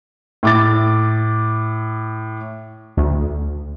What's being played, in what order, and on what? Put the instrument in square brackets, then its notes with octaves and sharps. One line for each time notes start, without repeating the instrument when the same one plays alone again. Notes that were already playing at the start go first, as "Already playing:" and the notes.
[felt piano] A2 D6 A6
[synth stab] D2